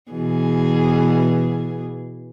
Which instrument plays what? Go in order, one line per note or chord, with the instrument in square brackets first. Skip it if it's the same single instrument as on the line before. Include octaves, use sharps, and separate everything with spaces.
[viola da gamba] B2 E3 G#4